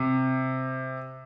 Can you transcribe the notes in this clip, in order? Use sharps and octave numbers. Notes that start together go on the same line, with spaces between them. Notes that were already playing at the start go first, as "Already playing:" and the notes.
Already playing: C3